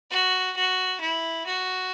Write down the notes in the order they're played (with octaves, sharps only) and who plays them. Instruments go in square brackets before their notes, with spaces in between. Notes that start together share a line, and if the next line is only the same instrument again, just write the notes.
[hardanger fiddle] F#4
F#4
E4
F#4